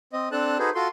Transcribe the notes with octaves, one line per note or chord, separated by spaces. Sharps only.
C4 D#5
C4 D4 A4 A5 F#6
D#4 F#4 G#4 A4 B4 C5
F4 F#4 A4 C6